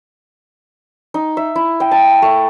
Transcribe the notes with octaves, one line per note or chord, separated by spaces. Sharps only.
D#4
E5
E4
G5
A5
A3